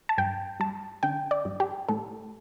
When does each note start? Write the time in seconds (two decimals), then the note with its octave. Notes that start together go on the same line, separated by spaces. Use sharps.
0.09 A5
0.18 G2 G5
0.60 G3 A5
1.03 D3 G5
1.31 D5
1.45 G2
1.60 G4
1.89 A2 A4